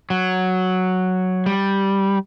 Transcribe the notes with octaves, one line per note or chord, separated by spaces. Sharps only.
F#3
G3